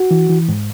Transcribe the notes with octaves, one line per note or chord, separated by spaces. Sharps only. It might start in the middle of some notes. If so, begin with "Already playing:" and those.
Already playing: F#4
E3
E3
G#2